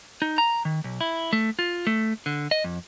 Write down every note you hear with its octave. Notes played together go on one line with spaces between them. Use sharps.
D#4
A#5
D#3
B1
E4
A3
F4
A3
D3
D#5
F2